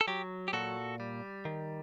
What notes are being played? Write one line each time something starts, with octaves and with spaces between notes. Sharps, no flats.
A4
F#3 G4
G4
A#2 F#4 A4
G3
D#3